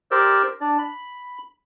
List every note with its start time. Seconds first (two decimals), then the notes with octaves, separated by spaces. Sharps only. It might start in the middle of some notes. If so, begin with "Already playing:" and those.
0.11 G4 A#4 C5 D5 E6
0.61 D4 D5
0.79 B5